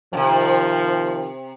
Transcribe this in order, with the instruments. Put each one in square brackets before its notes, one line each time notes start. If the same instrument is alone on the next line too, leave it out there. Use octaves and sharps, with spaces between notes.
[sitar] F#2 C3 [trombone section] D#3 F3